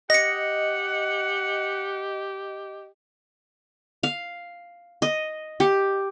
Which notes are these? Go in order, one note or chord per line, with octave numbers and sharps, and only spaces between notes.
G4 D#5 F#5 A#6 C#7
F5
D#5
G4